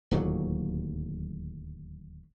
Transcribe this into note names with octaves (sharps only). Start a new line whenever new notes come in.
D1 D#2 A#2 F#3